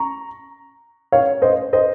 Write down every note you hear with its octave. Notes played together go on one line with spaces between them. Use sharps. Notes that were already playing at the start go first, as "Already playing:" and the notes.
Already playing: A#5 C#6
C#5 F5
C5 D#5
C5 D#5